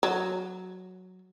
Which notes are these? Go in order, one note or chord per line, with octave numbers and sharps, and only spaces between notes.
F#3